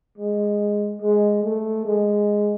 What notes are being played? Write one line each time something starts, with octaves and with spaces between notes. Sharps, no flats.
G#3
G#3
A3
G#3